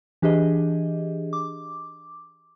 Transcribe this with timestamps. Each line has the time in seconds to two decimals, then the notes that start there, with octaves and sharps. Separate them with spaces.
0.22 E3 D4 G4 G#4 D#5
1.33 D6